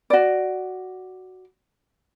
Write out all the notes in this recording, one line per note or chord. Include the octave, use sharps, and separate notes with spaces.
F#4 D5